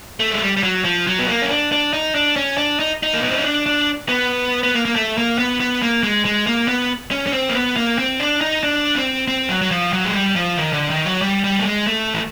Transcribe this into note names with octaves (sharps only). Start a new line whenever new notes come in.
A3
G#3
G3
G3
F#3
F3
F#3
B3
A#3
C#4
D4
D4
D#4
D4
C#4
D4
D#4
D#4
A#3
B3
C4
C#4
D4
D4
B3
B3
A#3
A#3
A3
A#3
B3
B3
A#3
G#3
G#3
A#3
B3
C#4
C#4
C4
A#3
B3
A#3
C4
D4
D#4
D4
C4
C4
F#3
F#3
F3
F#3
G#3
G3
F3
D#3
D3
D#3
F#3
G3
G3
A3
G#3
A3
E3